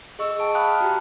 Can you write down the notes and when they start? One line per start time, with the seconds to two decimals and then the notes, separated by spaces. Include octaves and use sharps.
0.19 G#4 D#5 C#6 E6
0.40 G5 A5 D7
0.55 F5 G5 A5 B5 D#6 F#6
0.67 F6
0.80 F#4 G4 A#5